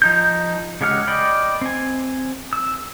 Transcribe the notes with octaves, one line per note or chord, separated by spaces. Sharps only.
F3 D#4 G6
C#3 G#3 G4 F#5 F6
D5 D#5 G5 B5
C4 G#5
E6